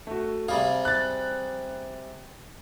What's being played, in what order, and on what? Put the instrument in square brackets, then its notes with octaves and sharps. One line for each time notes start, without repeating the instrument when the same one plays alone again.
[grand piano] A3 F#4
[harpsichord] C3 G3 G#4 [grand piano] F5
[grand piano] F#6 A6